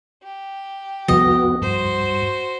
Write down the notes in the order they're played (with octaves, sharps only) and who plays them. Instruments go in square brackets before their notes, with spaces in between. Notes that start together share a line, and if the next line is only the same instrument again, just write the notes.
[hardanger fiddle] G4
[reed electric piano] C2 F2 [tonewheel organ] B3 F#4 [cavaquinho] D#5
[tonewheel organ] G2 [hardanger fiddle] F#4 C5